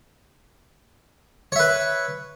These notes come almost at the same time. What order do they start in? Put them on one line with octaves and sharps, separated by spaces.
C#5 E5 B4